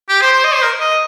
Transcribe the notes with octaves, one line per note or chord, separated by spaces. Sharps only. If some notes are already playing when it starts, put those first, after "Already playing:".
G4
C5
C5
D#5
C5
A#4
D#5